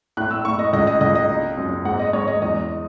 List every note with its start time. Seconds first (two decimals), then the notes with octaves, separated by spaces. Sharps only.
0.17 A2 F#6
0.31 E6
0.45 A2 C#6
0.59 D#5
0.73 C#2 D#5
0.87 D#5
1.01 C#2 D#5
1.15 D#5
1.29 D#4
1.57 F#2
1.85 G#2 F#5
1.99 D#5
2.13 G#2 C#5
2.28 D#5
2.42 E2 D#5